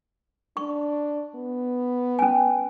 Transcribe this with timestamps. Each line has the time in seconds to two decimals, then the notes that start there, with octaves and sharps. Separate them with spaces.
0.57 D4 C#6
1.35 B3
2.19 C#4 G#5